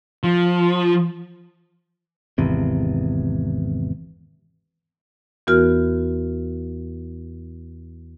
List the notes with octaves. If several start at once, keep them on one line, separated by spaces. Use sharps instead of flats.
F3
G#1 E2 C3
E2 E3 B3 F#4 A#4 F6